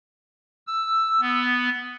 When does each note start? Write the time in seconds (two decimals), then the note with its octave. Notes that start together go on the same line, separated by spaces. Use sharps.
0.67 E6
1.21 B3